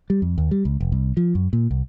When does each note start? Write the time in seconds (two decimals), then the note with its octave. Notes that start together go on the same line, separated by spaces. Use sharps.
0.10 G3
0.22 F2
0.38 D#2
0.51 G3
0.65 C#2
0.81 F1
0.92 C2
1.17 F3
1.35 F#2
1.53 A#2
1.71 C2